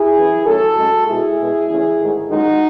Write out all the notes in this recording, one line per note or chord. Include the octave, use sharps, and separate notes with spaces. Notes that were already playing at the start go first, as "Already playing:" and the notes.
Already playing: E4 G#4
F#2 C#3 E3
D#2 C#3 F#3 A3 F#4 A4
F#2 C#3 G#3
B2 G#3 E4 G#4
B2 G#3
E2 C#3 E3 A3
G#2 D#3 A3
F#2 D#3 G#3 D#4 F#4